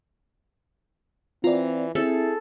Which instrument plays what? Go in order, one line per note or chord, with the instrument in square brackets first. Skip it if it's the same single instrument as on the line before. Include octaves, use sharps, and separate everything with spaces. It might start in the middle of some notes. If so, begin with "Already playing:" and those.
[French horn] E3 [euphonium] C4 [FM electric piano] F4 D5 [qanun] A#5
[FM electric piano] C4 [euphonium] E4 [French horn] G#4 [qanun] A4